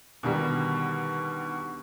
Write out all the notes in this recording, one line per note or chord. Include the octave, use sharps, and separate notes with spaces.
B2 D3 D#3 G3